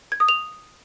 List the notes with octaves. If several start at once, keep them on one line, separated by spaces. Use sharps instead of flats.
G#6
D#6
F7